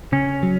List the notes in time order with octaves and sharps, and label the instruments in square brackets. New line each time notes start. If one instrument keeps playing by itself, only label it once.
[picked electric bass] C#3 [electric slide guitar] C#4
[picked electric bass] F#3